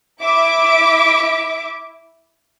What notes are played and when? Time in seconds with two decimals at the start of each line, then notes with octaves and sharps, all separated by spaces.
0.21 E4 E5 D6